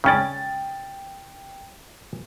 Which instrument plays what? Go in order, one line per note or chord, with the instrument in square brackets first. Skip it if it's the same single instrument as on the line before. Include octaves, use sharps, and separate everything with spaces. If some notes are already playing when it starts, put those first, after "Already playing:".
[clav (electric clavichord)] C#3 C#4 D5 [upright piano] G5 A6